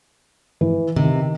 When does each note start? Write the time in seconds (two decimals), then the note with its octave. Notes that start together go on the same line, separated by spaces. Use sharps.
0.61 E3
0.96 C3 D#3